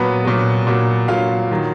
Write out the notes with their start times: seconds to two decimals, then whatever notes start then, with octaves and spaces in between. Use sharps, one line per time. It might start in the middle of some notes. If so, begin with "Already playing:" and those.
Already playing: A#2 F#3 B3 B4
0.25 A#2 F#3
0.67 A#2 F#3
1.08 A#2 F#3 F4 F5
1.51 D#3 F#3